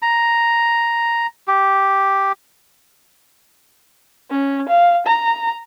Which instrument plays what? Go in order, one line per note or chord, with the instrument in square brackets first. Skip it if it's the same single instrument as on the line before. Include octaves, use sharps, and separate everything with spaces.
[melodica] A#5
G4
[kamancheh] C#4
F5
A#5